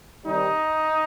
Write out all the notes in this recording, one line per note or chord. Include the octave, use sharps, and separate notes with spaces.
C3 D#3 G3 D#4